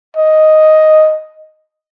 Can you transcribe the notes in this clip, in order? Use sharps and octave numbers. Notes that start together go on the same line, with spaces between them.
D#5